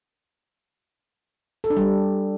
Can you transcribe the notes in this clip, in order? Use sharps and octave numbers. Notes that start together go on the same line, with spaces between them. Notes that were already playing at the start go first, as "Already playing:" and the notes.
A4
D4
G3